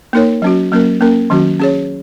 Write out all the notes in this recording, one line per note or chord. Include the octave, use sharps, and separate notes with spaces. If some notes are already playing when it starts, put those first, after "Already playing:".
A#3 D#4 A#4 C#5
F#3 C#4 F#4
F#3 A#3 C#4 A#4
A#3 C#4 A#4
D#3 F#3 C#4 F#4
C#4 G#4 C#5